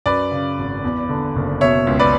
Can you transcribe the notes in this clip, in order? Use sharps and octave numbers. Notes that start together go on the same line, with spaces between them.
F#2 B4 D5
C#3
G#1
E2
D3
F#1
B2 C#5 E5
C#2
B4 D5